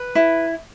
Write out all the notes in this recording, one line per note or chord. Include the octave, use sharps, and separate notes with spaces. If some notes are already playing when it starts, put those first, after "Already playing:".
Already playing: B4
E4